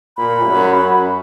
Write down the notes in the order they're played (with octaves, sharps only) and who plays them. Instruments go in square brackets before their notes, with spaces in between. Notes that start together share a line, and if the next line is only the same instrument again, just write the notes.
[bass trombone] A#2 [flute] B5
[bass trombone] F#2
F#2